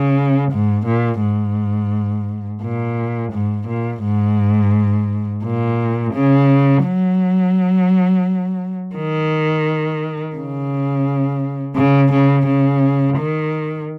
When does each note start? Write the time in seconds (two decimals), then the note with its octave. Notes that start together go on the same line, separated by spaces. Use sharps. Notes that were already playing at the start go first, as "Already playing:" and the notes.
Already playing: C#3
0.52 G#2
0.86 A#2
1.21 G#2
2.62 A#2
3.32 G#2
3.68 A#2
4.04 G#2
5.44 A#2
6.14 C#3
6.85 F#3
8.95 D#3
10.36 C#3
11.76 C#3
12.12 C#3
12.47 C#3
13.17 D#3